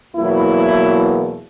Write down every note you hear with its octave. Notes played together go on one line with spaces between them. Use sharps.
E2 B2 F#3 A#3 E4